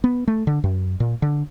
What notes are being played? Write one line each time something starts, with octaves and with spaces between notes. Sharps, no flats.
B3
A3
D3
F#2
A#2
D3